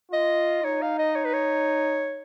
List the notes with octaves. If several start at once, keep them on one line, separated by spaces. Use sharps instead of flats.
F4 D#5
D#4 C#5
F5
D#5
C#5
B4
C#5